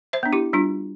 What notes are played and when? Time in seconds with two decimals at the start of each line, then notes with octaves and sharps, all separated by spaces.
0.13 C5 E5
0.23 B3 D4
0.33 E4 G4
0.53 G3 D4 F4